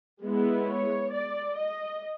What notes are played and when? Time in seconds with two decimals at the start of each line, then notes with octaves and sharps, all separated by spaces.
0.22 G#3 B3 E4
0.67 C#5
1.12 D5
1.57 D#5